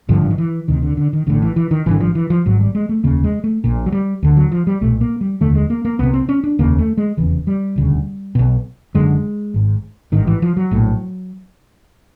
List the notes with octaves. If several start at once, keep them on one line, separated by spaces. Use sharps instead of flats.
G#1 G2 D3 F3
D3
D#3
E3
D2 C3 D#3
D3
D3
D#3
A1 A2 D3
E3
E3
D#3
G#1 G2 D3 E3
F3
E3
F3
G#1 G#2 F#3
G3
G#3
A3
F1 D#2 C#3 A#3
G#3
A3
A#1 A#2
F#3
G3
D2 D3
F#3
F3
G3
B1 A#2 A3
A#3
G3
F1 D#2 D3 A3
G#3
A#3
A#3
C2 C3 B3
C4
C#4
D4
F1 D#2 C#3 A#3
A3
G#3
F1 E2 C#3 E3
G3
E1 D2 C#3
B1 B2
F#1 F#2 D3 G#3
G#1 G#2
A1 G#2 D#3
E3
F3
F#3
A#1 A2